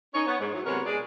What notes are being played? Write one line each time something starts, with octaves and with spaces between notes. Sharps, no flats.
C#4 D#4 C#5
B3 C#5
G#2
E3 F#3
C3 F#3 G#3 B3 A#4 C#5
B2 G#3 D4 G#4 D5